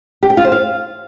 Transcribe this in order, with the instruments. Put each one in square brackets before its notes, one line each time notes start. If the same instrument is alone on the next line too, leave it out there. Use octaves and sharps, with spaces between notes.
[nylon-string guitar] G4
G5
F4
C5
F5